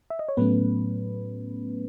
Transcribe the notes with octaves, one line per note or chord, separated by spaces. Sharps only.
E5
D#5
C#5
A2 F#3 A3 B3 C#4 B4